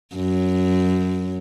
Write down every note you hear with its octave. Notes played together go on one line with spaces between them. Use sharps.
F#2